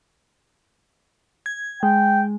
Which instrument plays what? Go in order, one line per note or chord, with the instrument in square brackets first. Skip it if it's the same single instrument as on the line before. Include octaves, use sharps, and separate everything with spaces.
[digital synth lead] G#6
[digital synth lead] G#3 [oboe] G5